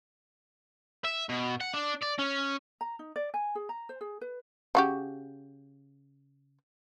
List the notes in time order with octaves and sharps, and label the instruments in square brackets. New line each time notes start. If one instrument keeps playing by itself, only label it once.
[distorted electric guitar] E5
B2
F#5
D4
D5
C#4
[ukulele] A#5
D#4
D5
G#5
G#4
A#5
C5
G#4
B4
[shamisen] C#3 F#4 G4